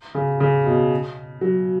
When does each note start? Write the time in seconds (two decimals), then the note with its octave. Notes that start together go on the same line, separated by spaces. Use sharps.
0.15 C#3
0.40 C#3
0.66 B2
1.41 F#3